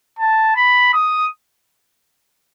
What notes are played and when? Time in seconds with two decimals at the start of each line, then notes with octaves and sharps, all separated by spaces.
0.19 A5
0.56 B5
0.93 D#6